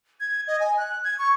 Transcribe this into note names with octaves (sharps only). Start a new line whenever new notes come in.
G#6
D#5
G#5
F#6
G#6
C#6